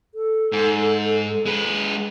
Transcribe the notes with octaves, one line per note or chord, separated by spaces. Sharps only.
A4
G#2
G#3 B4